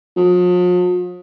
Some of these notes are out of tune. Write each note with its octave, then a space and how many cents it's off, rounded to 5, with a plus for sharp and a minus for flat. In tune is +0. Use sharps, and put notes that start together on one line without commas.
F3 +45